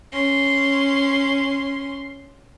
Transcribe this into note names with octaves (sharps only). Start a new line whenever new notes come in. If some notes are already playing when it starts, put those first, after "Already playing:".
C#4 C6